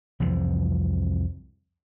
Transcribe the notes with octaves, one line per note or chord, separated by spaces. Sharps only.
C2 F2 E3 F3